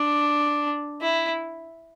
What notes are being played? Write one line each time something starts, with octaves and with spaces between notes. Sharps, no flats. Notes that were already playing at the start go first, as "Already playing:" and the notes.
Already playing: D4
E4